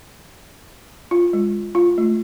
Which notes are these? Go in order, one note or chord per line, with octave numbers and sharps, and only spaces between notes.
F4
G#3
F4
A3